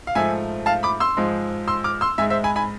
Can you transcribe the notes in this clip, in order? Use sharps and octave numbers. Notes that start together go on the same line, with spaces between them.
F5
G#2 F3 A3 E5 G#5
F5 A5
B5 D6
C6 E6
G#2 F3 G#3
C6 E6
D6 F6
C6 E6
G#2 G#3 E5 G#5
C5 E5
G#5 B5
G#5 B5